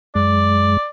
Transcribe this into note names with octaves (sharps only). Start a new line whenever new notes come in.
F#2 G#3 D5